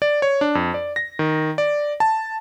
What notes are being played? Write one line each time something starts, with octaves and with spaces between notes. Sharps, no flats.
D5
C#5
D4
F2
D5
A#6
D#3
D5
A5